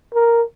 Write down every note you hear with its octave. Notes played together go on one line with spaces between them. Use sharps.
A#4